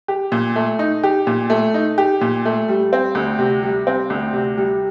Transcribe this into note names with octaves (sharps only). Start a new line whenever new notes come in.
G4
A#2
A3
D#4
G4
A#2
A3
D#4
G4
A#2
A3
G3
C4
D2
C3
G3
C4
D2
C3
G3